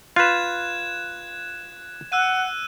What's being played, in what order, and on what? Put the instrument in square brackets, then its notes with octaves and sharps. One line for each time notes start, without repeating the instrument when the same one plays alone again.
[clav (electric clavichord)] F4 B4 [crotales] F#6 G#6 E7
[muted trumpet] F#5 [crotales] E6 F#6 D#7